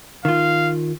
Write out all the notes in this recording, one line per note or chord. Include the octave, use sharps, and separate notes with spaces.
D#3 F4 F5